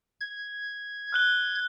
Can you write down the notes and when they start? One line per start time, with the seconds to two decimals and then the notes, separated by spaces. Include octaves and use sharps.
0.21 G#6
1.12 F6 F#6 G7